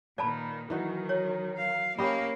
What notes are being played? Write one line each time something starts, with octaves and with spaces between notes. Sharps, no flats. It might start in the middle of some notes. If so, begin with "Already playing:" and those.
A#2 D#3 B4 D5 A5 B5
D#3 E3 F#3 D#4 F#4
C#5
F5
A#3 C#4 G4 C#5 D#5 B5